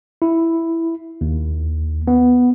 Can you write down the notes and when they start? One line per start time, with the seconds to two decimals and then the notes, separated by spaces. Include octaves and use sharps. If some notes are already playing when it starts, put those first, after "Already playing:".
0.22 E4
1.21 D#2
2.08 B3